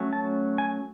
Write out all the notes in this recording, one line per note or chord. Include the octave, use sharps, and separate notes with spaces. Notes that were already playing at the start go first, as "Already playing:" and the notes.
Already playing: F#3 A3 C#4
A5
G#5